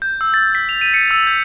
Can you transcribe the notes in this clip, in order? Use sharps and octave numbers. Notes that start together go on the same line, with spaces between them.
G6
E6
A6
B6
F7
D#7
C#7
E6
G6